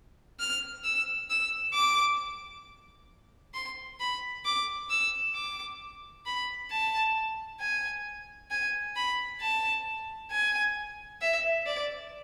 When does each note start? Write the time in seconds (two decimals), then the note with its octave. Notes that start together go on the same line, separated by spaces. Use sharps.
0.40 F6
0.84 E6
1.30 E6
1.74 D6
3.54 C6
4.00 B5
4.46 D6
4.90 E6
5.35 D6
6.26 B5
6.71 A5
7.60 G#5
8.51 G#5
8.97 B5
9.41 A5
10.32 G#5
11.22 E5
11.66 D5